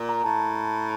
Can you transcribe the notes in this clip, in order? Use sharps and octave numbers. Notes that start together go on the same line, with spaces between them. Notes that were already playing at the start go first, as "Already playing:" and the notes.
Already playing: A#2
A#5
A2 A5